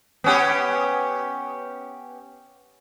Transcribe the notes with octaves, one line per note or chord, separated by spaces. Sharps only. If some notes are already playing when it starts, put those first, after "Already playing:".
B3 C#4 G4